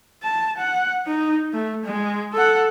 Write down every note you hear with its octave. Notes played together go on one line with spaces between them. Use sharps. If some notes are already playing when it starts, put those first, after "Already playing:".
A5
F#5
D#4
A3
G#3
A4 F#5